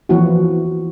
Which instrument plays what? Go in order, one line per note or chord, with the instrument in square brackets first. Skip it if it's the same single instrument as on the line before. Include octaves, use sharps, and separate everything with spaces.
[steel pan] E3 F3 A#3 E4 F#4